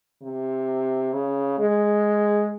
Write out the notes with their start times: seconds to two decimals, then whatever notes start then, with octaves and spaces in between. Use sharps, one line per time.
0.22 C3
1.13 C#3
1.59 G#3